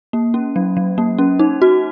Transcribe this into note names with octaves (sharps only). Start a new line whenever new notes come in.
A#3
C#4
F#3
F#3
A#3
C#4
D#4
F#4